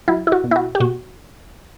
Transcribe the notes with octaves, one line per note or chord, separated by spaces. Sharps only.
F#3 E4
E4
F#4
B2
E4
F#4
G4
B2 F#4